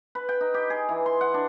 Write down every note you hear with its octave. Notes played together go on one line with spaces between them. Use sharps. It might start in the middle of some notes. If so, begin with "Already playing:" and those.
B4
G5
D#4
G4
G#4
E3
C6
F#5
D4